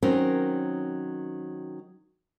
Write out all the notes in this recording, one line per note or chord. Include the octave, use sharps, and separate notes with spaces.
D#3 F#3 C4 C#4 A#4